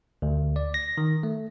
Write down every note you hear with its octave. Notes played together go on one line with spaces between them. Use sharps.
D2
D5
A#6
D#3
A3